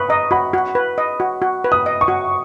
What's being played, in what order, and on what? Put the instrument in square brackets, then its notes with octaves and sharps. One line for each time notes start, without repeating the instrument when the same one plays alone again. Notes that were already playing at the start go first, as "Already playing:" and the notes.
Already playing: [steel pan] B4 [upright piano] B5 C#6 D#6
[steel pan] D#5 [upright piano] A#5
[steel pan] F#4 [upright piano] B5
[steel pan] F#4
B4
D#5
F#4
F#4
B4
[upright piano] D#6
[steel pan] D#5
[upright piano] C#6
[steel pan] F#4